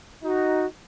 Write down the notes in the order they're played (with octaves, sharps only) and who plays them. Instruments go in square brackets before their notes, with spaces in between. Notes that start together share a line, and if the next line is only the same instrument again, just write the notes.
[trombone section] D#4 [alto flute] F#4